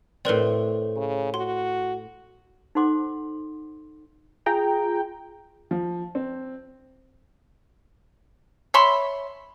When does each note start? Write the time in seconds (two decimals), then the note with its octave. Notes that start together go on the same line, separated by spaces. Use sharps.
0.25 A2 C4 A#4 B4 D5
0.97 C#3
1.34 F#4 C6
2.75 D#4 A4 C5 F#5 C6 D6
4.46 F4 G#4 G5 A#5
5.71 F3
6.15 C4
8.74 C#5 E5 B5 C6